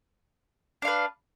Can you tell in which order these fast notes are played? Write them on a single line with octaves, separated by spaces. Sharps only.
D4 F5 B4